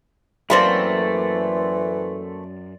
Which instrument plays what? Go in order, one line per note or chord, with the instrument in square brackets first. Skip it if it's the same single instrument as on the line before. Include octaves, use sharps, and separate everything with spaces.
[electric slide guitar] F#2 [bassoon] E3 [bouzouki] A3 A#3 C4 [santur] D5 C6